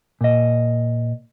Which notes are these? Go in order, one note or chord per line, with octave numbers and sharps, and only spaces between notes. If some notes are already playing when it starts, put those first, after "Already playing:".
A#2 D#5